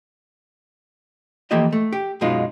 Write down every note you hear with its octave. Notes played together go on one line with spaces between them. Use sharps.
E3 F3 A#3 G4 A4 D#5
A3
G4
F#2 B2 G#3 B3 D#4 F4